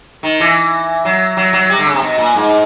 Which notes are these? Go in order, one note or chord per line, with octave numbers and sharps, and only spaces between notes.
D#3
E3
F#3
F#3
F#3
G3
D3
C#3
C3
B2
A#2
G#2